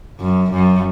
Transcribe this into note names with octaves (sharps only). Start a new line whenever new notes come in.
F#2
F#2